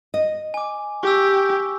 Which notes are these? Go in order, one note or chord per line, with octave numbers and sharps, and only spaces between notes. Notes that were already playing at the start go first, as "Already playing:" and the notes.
D#5
G#5 D6
G4 C#6 D6 E6